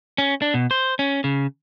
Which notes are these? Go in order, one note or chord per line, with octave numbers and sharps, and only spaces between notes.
C#4
D4
B2
C5
C#4
C#3